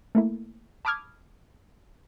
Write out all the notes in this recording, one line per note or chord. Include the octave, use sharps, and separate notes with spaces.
A3 A#3 E4
A5 B5 D6 D#6 F6 G#6